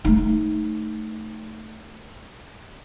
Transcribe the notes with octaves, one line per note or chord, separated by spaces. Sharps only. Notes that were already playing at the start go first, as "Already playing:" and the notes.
A3 D#4